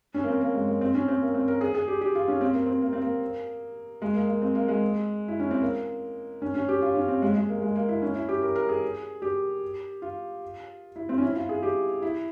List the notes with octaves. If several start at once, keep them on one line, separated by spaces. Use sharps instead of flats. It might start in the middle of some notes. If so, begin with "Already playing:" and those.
C#4
A#3
C4
A#3
G#3
A#3
C4
C#4
C4
A#3
C4
A#4
G#4
G#4
G4
G4
F4
C#4
C4
A#3
C4
A#3
C4
A#3
G#3
A#3
A#3
C4
A#3
G#3
E4
C#4
C4
A#3
C#4
C#4
G4
F4
C#4
C4
G#3
G#3
A#3
G#3
A#3
E4
C#4
E4
G4
A#4
A#4
G#4
G4
F4
E4
C4
C#4
E4
F4
G#4
G4
E4